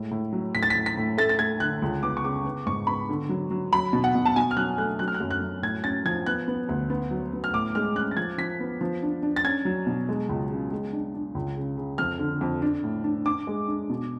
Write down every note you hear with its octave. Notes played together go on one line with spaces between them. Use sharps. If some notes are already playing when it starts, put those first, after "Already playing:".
Already playing: A2 G#3
A2
F#3
A2 B6
A6
B6
A2
B6
A2
A3 A6
A6
A3 G#6
D3 F#6
C#2
B3 D6
C#6
C#3 D6
B3
G#2 C#6
B3 B5
D3
F#3
F#3
F#3 B5
B2
F#5
B2
A5
B2 G#5
F6
F#3 F#6
A3 F#6
F#3 F#6
F6
F#6
F#2
F#6
F#2
A2 G#6
C#4 A6
F3 G#6
B3 F#6
B3
D2
B3
F#3
B3
F6
A2 D6
G#3 F6
C#4 F#6
A6
F3 G#6
F3 B6
B3
F3
D4
D4
A6
C#4 G#6
F#3
B2
G#3
C#2
C#3
G#3
D4
D4
C#2
C#3
C#3
F2 F6
D3
F2
D4
A2
D4
D4 D6
G#3
D4
B2